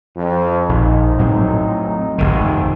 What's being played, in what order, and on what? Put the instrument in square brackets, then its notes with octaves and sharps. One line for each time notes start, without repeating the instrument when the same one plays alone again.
[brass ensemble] F2
[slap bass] A#1 [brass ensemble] D#4
[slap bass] A2 F#3 C4
F1 A#1 D#3